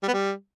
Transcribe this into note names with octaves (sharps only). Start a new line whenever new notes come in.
G3
B3
G3